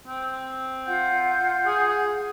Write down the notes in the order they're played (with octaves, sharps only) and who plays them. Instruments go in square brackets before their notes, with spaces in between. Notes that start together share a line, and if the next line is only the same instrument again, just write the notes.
[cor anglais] C4
[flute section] F4 F#5 G6
[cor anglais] G#4